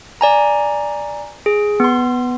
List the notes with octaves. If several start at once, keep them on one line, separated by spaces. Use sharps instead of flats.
D5 G#5 A#5
G#4
B3 C6